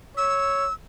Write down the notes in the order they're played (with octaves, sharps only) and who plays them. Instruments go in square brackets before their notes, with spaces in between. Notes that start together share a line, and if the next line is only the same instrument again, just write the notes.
[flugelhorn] C#5 [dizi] E6